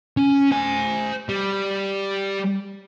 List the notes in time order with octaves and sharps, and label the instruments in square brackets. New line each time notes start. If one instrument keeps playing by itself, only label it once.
[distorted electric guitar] C#4
C5 G#5
G3